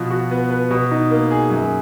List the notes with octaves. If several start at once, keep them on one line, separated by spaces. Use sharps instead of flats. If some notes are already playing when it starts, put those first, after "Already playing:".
Already playing: B2 F3
F#4
B3
B4
B2
D#4
A#3
G#4
F#2